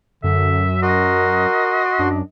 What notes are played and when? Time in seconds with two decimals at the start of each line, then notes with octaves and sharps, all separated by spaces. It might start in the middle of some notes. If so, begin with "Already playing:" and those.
0.24 F#2 D3 E5
0.83 F#4 A#4 D#5 C6
1.99 F#2 D4